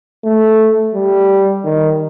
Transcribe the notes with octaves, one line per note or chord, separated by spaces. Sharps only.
A3
G3
D#3